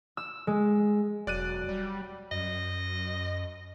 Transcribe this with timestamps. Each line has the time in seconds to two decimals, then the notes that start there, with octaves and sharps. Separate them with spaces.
0.17 E6
0.47 G#3
1.27 E1 F#3 D5 F#6 D#7
1.69 G3
2.31 F#2 D#5